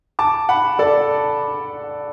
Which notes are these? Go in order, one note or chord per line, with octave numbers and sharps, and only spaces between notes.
A5 D6
F#5 B5
A4 D5